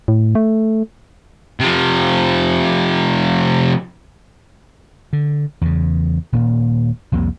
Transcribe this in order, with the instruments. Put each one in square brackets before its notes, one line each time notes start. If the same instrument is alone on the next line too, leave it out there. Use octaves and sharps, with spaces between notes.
[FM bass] A2
A3
[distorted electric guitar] C3 F3
[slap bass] D3
E2 C#3
D#1 A#2 A#3
C2 F2 C3 A#3